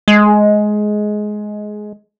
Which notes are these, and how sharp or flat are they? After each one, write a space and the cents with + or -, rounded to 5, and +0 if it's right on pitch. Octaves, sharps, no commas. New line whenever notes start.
G#3 +15